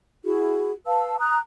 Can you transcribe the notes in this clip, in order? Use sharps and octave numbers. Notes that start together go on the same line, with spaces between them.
E4 F#4 G#4
B4 F5 A5 E6
A#5 D#6 F#6